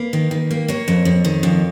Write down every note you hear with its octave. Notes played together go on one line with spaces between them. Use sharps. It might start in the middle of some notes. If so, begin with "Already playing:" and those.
Already playing: A#3 B4
D#3
D#3
A#3
A#3 C#5
F2
F2
D#3
F2